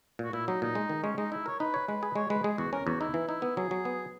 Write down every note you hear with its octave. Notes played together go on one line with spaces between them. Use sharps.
A#2
F#4
A#2 E4
F#3 D#4
A#2 D#4
G#3
D#3
G#3 C#4
G#3 D#4
D#4 E4
A#4 C#5
D#4 B4
C#5
G#3 B4
G#4
G#3 C#5
G#3 B4
G#3 G#4
E2 F#4
C#4 A#4
E2 F#4
D#4 E4
E3
D#4 E4
B3
F#3 G#4
F#3
B3